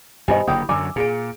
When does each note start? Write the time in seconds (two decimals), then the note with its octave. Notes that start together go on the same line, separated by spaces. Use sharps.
0.28 G2 B2 D#3 G4 C5 D#5 G#5 B5
0.48 F#1 D3 A#3 E4 G4 G5 D#6
0.69 F#2 D3 F#3 G#5 D6 E6
0.96 A#2 G#4 D7